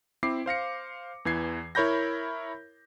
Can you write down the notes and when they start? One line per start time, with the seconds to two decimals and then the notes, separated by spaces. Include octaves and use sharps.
0.23 C4 E4 D6 C7
0.46 C5 F5 A#6 C#7
1.25 E2 E3 G#6 C7
1.75 E4 A#4 C#5 B5 G6 A#6